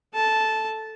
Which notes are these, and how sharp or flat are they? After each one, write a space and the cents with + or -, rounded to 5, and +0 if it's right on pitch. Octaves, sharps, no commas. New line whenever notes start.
A4 +0 A5 -10